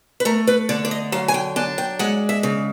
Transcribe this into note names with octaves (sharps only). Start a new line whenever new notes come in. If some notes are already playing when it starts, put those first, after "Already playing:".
B4
A3 A#4
B4
D3 D5
D5
D#5
F#3 F5
G#5
G5
D4 G#5
G5
G#3 F#5
E5
C#3